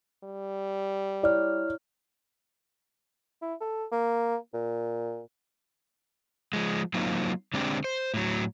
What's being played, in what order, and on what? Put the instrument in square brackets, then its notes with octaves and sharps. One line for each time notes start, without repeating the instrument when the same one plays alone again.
[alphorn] G3
[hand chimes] E4 C#5 F6 [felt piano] D5
[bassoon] E4
A4
A#3
A#2
[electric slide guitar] F3 G#3
F#3 A#3 C4 D#4 F4
D3 G#3 C4 D4 G4
C5
A2 F#3